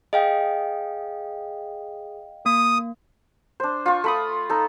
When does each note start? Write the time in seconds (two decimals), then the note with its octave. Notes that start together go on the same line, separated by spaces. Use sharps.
0.13 G#4 D#5 F5 G5
2.46 A#3 D#6
3.60 D4 C5
3.86 F4 C#6
4.04 A3 B5 D#6
4.50 D#4 A4